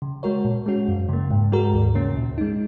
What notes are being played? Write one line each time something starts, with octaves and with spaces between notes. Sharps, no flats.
C#3
G#3 F#4 A#4 C#5
A#2
G#3 C#4 F#4
F#2
C#3 A#3
G#2
G#3 F#4 A#4
D#2
C#3 A#3 C#4
A#2
G#3 D#4